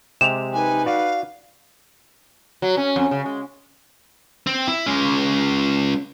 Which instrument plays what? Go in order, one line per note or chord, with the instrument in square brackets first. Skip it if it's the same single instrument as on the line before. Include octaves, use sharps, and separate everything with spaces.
[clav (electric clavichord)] C3 G#3 G4 [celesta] E7 F7
[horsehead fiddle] D#4 B4 [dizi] G#5
[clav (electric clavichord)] F#4 D5 [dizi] F5
[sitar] F#3
C#4
F2
C#3
G#3
[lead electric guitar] C4
E4
G#3 C#4